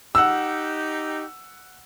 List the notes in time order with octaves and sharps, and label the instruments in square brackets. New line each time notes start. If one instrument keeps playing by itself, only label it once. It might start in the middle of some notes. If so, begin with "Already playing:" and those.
[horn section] D#4 G4 [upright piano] F#5 E6